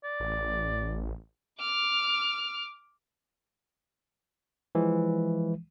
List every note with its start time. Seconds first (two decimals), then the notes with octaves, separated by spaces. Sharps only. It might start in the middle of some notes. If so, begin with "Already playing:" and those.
0.04 D5
0.20 A1
1.59 D6 F6
4.75 E3 F3 G#3